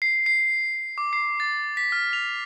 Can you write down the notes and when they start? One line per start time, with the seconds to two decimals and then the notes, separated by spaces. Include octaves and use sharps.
0.02 C7
0.26 C7
0.98 D6
1.13 C7
1.40 A6
1.77 B6
1.92 F6
2.13 F7